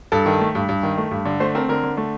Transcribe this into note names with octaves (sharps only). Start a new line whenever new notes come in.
G2 A4
D#3
A3
G2
G2
D#3
A3
G2
D3
A3 C5
C4 A#4
D3 A#4
D3
A3